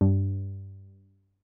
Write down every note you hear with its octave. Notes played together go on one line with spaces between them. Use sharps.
G2